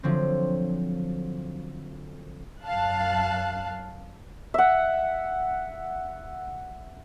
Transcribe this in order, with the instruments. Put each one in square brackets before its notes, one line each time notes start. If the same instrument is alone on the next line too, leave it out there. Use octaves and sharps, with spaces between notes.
[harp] D3 F3 F#3 C4
[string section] F#2 F5 A5 F#6
[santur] E5 F#5